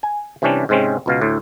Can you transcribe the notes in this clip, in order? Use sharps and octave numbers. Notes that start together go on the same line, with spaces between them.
G#5
C3 E3 G3 C#4 D4
G#2 C3 G#3 C4 C#4
C#2 B2 F5
D2 A2